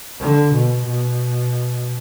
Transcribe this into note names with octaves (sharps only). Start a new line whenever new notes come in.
D3
B2
B2